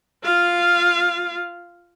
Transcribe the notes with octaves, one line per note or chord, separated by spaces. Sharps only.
F4 F5